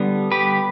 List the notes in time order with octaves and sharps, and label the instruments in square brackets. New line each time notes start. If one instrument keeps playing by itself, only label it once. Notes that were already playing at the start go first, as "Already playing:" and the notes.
Already playing: [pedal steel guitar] D3 G3 B3
G4 B4